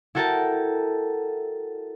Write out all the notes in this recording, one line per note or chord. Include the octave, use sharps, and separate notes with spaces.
E4 F#4 A4 A#4 G5 A5